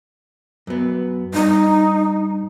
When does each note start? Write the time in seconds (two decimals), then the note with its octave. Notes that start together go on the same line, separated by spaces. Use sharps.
0.67 F#2 B3
1.34 G2 D#4